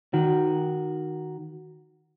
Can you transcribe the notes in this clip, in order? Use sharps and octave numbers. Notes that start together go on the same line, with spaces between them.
D#3 F#4